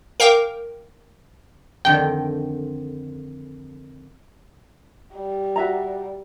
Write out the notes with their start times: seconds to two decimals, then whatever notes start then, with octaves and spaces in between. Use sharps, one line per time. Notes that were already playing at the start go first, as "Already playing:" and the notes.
0.20 A#4 F5 G5 D6
1.85 F2 D3 D#3 G5
5.14 G3
5.56 F#4 E5 A#5